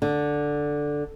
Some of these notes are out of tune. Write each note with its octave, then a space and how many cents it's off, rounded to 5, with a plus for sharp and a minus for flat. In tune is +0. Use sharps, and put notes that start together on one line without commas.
D3 +0